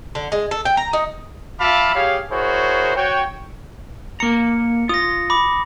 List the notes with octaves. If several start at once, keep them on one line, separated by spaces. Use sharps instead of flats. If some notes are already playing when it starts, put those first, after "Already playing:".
D3
G#3
A4
G5
A#5
D#4
F4 E5 F5 A5 B5 D6
G4 G#4 C#5 F5
E4 F#4 G#4 A#4 C5 C#5
F#4 C#5 G5
A#3 A#5 C#7
F4 D#6 A#6
B5 D6